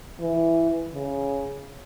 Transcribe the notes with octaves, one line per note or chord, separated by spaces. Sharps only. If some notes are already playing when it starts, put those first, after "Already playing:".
E3
C#3